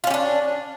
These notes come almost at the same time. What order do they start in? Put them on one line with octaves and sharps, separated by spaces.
F4 C#4 G4 D4